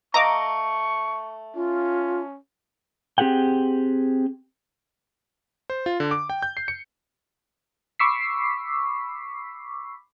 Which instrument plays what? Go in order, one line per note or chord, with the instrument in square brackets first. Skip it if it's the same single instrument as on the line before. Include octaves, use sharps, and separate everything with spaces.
[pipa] A3 D#5 F5 [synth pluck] A#5 D6 [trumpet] C#6
[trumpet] C#4 [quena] F4
[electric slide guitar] C4 G4 G#4 F#5 G5
[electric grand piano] C5
F4
D3
D6
G5
G6
C7
C#7
[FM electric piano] B5 C#6 D6 E6 B6 C7